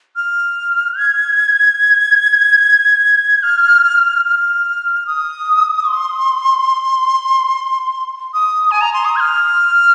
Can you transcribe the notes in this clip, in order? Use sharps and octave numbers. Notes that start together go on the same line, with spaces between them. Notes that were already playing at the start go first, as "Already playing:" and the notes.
F6
G#6
F6
F6
D#6
C6
D#6
G#5
A#5
C6
D#6
G#6
F6